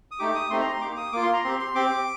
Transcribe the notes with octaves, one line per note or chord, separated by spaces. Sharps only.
D#6
A3 D#4 G4 D6
D#6
A3 C4 D#4 G4 C6
A#5
C6
A#3 D#4 G4 D6
D#6
A#3 F4 D6
C6
A#5
C4 G4 C6
C6
C4 G4 D6